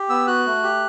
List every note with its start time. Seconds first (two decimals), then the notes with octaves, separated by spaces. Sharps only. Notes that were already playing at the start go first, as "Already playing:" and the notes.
Already playing: G4
0.10 B3 E6
0.27 F#4 F#6
0.46 A3
0.63 G4